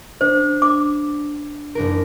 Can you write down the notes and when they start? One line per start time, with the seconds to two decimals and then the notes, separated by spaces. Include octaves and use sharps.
0.21 D4 C5
0.62 D6
1.75 F#1 D4 A#4